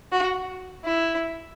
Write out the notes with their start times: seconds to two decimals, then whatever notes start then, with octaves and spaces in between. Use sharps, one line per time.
0.12 F#4
0.84 E4